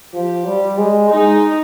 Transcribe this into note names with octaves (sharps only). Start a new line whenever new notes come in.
F3 G4
G3
G#3
G#3 D#4